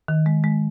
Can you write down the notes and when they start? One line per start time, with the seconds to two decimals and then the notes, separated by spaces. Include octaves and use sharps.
0.08 D#3
0.26 G#3
0.44 G#3